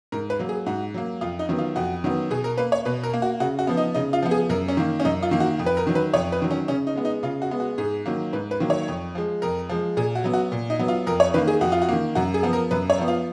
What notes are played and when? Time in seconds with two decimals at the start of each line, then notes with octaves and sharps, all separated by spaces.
0.12 G#2 A#4
0.30 B4
0.39 F#3 A#3
0.49 G#4
0.66 G#2 F#4
0.94 F#3 A#3
1.21 F2 F4
1.39 D#4
1.49 D#3 F#3 B3
1.58 F4
1.76 F2 F#4
2.04 D#3 F#3 B3
2.30 B2 G#4
2.44 A#4
2.58 A#3 B4
2.72 C#5
2.85 B2 B4
3.03 A#4
3.13 A#3
3.22 F#4
3.40 C#3 F#4
3.59 F#4
3.67 F3 B3
3.77 D#4
3.94 C#3 D#4
4.13 F4
4.23 F3 B3
4.31 G#4
4.49 F#2 A#4
4.68 C#4
4.77 D#3 A#3
5.00 C#4
5.05 F#2 D#4
5.23 F4
5.31 D#3 A#3
5.40 F#4
5.59 F2
5.66 B4
5.77 A#4
5.87 D#3 F#3
5.95 B4
6.14 F2 C#5
6.32 B4
6.42 D#3 F#3
6.51 C#4
6.68 C#3 C#4
6.87 D#4
6.96 G#3 B3
7.05 D#4
7.23 C#3 F4
7.42 F#4
7.51 G#3 B3
7.60 F#4
7.78 G#2 G#4
8.06 D#3 F#3 A#3
8.33 G#2 B4
8.51 B4
8.60 D#3 F#3 A#3
8.70 C#5
8.88 F2
9.15 F3 G#3
9.42 F2 A#4
9.69 F3 G#3
9.97 A#2 G#4
10.15 F#4
10.24 F#3 B3
10.34 F#4
10.52 A#2
10.70 D#4
10.79 F#3 B3
10.88 F4
11.07 F2 A#4
11.20 C#5
11.34 D#3 A#3 B4
11.47 G#4
11.61 F2 F#4
11.72 F4
11.82 F#4
11.89 D#3 A#3
12.15 F#2 F#4
12.34 G#4
12.43 F3 B3
12.53 A#4
12.71 F#2 B4
12.90 C#5
12.98 F3 B3
13.08 F4